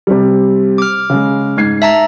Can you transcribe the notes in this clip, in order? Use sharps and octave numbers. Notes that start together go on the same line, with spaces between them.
C3 G3
D6 F6
C#3 G#3
G#2 G#6 C7
E5 A5 A#5